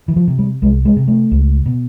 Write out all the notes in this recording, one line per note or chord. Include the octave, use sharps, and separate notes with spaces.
E3
F3
C3
G3
C2 G#3
G#3
C3
A3
C#2
B2